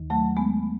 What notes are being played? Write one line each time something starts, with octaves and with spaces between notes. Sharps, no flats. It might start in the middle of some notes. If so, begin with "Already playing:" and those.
Already playing: D#2 D#3
F#3 A3
G#3 B3